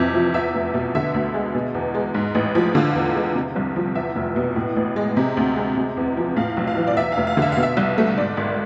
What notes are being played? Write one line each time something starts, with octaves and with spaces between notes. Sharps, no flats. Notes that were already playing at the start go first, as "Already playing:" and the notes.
Already playing: F2 C3 E3 E5
F3
E2 E5
F1
B2
D3 E5
D2
G#3
B2
E2
G#3
G#2
A1
F3
D3 F5
E2
G#3
C3
C2
F3
E2 E5
F1
B2
A2
A1
G#3
C3
D2
G#3
C3
E2
F3
A2 F5
B1
F5
E3
D5
E2 E5
F5
F1
F5
D3 E5
B2 F5
E5
C2
A3
G#2 D5
G#1